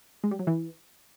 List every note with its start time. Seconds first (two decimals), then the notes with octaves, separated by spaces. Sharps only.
0.24 G#3
0.31 G3
0.39 F#3
0.47 E3